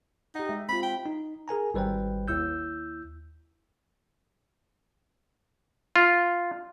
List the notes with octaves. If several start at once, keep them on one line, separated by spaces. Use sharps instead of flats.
D#4 G4 F#5
G#3 E5
C4 F4 B5
G5
D#4
G#4 A#4 G#5 A#5
G#1 G3 B4 C5 G5
D#2 E4 E6 G6
F4